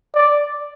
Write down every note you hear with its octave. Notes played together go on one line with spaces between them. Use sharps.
D5